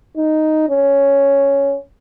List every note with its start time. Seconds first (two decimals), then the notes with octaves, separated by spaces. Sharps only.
0.17 D#4
0.69 C#4